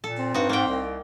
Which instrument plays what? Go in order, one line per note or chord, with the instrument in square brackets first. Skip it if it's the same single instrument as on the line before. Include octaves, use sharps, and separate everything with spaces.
[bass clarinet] A#2 [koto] A4
[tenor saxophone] C4
[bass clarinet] G2 [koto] D#4 F#4
[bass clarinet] G#2 [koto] A#3 G5
[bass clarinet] C2